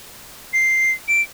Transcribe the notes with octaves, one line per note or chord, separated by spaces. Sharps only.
C7
D7